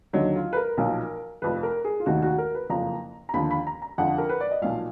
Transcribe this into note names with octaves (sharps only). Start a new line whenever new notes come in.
D#2 D3 F#3 D#4
F4
B4
A#4
B1 A#2 F3
F1 F2 F3 B4
A#4
G#4
F4
F1 D#2 D#3 F#4
F#4
A#4
B4
F#1 F2 F3 A#5
A#5
D#2 D3 F3 B5
B5
A#5
A#5
F2 D3 F3 F#5
A#4
B4
D5
D#5
B1 A#2 F3 F5